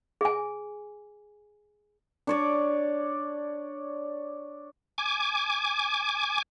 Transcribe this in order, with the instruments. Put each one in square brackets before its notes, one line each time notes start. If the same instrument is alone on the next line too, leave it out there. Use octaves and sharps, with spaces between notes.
[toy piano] G#4 G#5
[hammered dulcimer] D4 C#5 D5
[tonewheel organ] G#5 D6